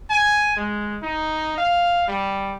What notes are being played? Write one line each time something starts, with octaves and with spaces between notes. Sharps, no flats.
G#5
G#3
D#4
F5
G3